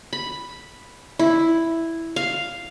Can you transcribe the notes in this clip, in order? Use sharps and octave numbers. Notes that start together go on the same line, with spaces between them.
B5
E4
F5